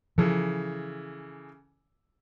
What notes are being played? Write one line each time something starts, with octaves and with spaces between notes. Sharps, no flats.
C#3 E3 F3 A4